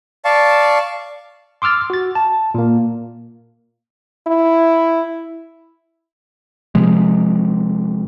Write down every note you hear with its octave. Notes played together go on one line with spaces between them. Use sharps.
D5 F5 A5 C#6
C6 D6 E6 F6 A6
F#4 A6
A5
A#2 A#3
E4
C3 F3 G#3